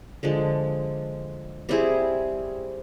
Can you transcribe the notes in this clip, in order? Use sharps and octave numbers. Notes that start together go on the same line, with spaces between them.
D3 F3 G#3
G3 C4 E4 G#4